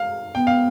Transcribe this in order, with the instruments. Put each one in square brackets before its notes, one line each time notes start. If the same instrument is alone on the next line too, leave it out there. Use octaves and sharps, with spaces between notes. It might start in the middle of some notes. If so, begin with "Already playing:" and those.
Already playing: [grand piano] F5
[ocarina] B3 [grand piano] G5
[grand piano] F5